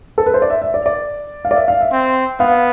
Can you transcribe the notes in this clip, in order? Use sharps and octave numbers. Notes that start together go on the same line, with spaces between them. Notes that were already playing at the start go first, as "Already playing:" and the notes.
A4
B4
C5
D5
E5
E5
D5
D5
F5
D5
E5
F5
E5
C4
B3 F5